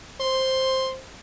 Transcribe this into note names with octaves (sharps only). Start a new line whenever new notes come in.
C5 C6